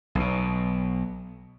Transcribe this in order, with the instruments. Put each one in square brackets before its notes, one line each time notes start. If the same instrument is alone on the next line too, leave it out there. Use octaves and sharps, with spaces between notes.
[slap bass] B1 B2